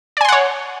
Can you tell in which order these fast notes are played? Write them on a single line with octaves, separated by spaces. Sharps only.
D5 G#5 C6 F#5 C#5